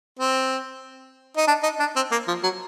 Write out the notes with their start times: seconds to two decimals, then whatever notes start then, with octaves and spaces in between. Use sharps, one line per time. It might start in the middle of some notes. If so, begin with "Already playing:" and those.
0.19 C4
1.37 D#4
1.48 D4
1.63 D#4
1.80 D4
1.96 C4
2.12 A#3
2.28 F3
2.43 F#3